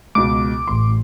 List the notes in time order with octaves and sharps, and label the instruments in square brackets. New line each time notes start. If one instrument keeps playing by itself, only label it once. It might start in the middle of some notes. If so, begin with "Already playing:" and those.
[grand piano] C#2 B2 [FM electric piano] D6
[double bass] A1 [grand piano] C6